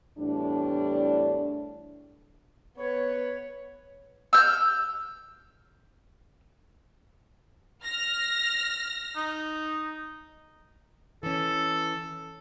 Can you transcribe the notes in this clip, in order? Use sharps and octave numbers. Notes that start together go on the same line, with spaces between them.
E2 A2 G3 D4
B3 B4 C#5
E6 F6 G6
F6 A#6
D#4
E3 C#4 A4